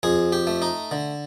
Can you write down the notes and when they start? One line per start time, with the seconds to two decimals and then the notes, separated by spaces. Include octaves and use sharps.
0.03 F2 G#4
0.32 G4
0.47 A3
0.62 D#4
0.91 D3